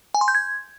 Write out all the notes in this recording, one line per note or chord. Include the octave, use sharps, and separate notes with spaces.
G#5
C6
G6
G#6